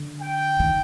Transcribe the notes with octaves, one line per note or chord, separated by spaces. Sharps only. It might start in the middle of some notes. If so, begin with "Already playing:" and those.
Already playing: D3
G5
D#3